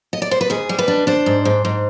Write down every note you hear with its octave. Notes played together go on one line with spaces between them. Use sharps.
D#5
D5
C5
B4
G#2 G#4
G3
B4
D4
D4 C5
G#2
G#2
G#2